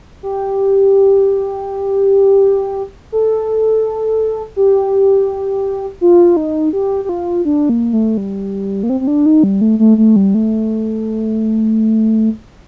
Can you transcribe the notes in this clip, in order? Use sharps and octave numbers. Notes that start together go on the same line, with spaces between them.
G4
A4
G4
F4
D#4
G4
G4
F4
D4
A#3
A3
G3
A#3
C4
C4
D4
D#4
G3
A3
A3
A3
G3
A3